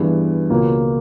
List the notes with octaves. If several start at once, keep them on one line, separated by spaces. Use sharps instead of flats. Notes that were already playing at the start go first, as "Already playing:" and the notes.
Already playing: G2 E3 G#3 B3
C#2 B2 A#3